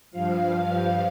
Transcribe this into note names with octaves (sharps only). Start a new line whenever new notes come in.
G2 F3 F5
G2 F3